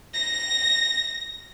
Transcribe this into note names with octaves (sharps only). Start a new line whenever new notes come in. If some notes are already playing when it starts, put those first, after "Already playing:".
A#6